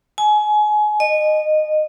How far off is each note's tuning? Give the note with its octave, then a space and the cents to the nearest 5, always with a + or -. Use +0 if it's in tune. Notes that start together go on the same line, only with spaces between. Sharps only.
G#5 +25
D#5 -20